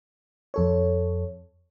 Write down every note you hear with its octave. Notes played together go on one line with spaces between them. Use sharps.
F2 A4 C#5